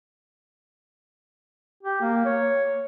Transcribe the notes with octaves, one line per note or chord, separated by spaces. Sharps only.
G4
A#3
C#5